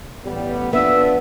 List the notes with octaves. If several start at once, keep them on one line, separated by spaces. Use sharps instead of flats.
A1 G3 B3
F2 F3 B3 D4 E5